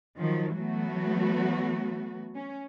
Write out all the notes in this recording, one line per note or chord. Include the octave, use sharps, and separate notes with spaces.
D#3 F3 F#3
E3 F#3 A3 B3 F#4
C#4